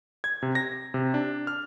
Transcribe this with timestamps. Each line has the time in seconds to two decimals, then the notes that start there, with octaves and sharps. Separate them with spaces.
0.24 G#6
0.43 C3
0.55 A#6
0.94 C3
1.14 D4
1.47 F6